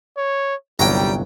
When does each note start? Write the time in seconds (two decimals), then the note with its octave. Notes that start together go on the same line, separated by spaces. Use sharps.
0.17 C#5
0.79 G1 C2 F#3 G3 G5 A#5